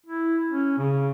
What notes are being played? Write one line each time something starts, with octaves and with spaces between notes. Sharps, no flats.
E4
C#4
C#3